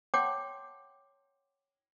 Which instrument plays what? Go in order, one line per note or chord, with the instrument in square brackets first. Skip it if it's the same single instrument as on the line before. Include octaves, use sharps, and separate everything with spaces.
[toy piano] C#5 F#5 G5 A5 C6 D6